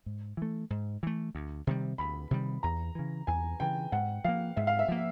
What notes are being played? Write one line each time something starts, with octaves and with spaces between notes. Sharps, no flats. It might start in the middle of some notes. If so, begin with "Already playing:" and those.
G#2
E3 A3
G#2
E3 A3
D2
C3 D#3 G3
D2 B5
C3 D#3 G3
E2 A#5
C#3 E3
E2 G#5
C#3 E3 G5
G#2 F#5
F3 A#3 F5
G#2 E5
F5
E5
F3 A#3